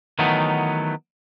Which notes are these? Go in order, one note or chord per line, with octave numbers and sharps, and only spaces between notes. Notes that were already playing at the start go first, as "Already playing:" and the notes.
D#3 E3 F#3 A3 B3 D#4